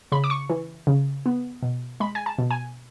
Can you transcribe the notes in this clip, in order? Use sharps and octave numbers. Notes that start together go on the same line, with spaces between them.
C#3 B5
D6
C#6
E3
C#3
B3
B2
G#3 B5
G#5
A5
B2
G#5